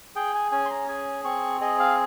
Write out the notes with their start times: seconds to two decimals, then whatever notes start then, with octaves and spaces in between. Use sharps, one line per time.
0.16 G#4 G5
0.34 G#5
0.52 C#4 G#5
0.65 C6
0.70 A#5
0.88 G#4 G#5
1.24 C4 C#6
1.61 G#4 D#5
1.79 F5